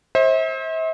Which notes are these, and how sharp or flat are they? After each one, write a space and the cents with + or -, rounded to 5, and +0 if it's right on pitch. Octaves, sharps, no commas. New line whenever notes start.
C5 +30 E5 -40